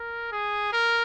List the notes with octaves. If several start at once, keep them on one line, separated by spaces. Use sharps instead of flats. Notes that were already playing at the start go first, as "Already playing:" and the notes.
Already playing: A#4
G#4
A#4